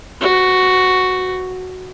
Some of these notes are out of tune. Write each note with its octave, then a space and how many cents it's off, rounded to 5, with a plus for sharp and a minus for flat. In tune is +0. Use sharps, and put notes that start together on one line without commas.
F#4 +0 B4 +35